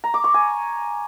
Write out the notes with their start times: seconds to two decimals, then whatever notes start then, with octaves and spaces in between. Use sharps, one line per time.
0.04 A#5
0.14 D6
0.24 C#6
0.34 G#5